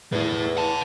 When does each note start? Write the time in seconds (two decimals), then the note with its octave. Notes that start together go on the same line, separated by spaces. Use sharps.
0.12 E2 A2 E4
0.57 F#5 A5